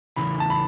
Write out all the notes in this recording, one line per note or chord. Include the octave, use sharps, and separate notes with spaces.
E2 C#3 E3 B5
A5
B5